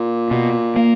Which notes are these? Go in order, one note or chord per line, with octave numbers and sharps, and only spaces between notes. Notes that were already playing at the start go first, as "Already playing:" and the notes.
Already playing: A#2
B2
A#3